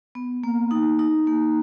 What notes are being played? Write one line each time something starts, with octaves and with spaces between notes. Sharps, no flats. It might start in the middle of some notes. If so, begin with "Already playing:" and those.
B3
A#3
D#4
D#4
A#3